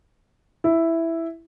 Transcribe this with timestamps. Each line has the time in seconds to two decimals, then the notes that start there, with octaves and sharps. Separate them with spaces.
0.64 E4